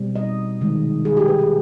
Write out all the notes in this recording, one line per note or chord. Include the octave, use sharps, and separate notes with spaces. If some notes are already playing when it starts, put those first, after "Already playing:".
Already playing: B2 G3 C4
D#5
C3 D#3 G#3
G#4
G4
B4
G#4